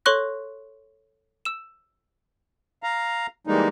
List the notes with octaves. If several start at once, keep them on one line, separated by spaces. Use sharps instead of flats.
A4 C#5 C6 C#6 F#6 A#6
E6 E7
F5 A#5
E3 G3 G#3 A#3 D#4